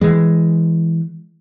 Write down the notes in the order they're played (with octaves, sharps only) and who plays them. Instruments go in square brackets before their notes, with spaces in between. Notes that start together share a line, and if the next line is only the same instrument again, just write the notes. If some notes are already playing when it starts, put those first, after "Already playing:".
[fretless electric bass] E3 G#3